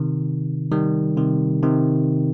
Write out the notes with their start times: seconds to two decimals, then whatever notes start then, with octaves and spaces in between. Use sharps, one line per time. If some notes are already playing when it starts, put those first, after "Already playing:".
Already playing: C3 D#3
0.71 D#3 G3
1.17 C3 D#3
1.63 C3 D#3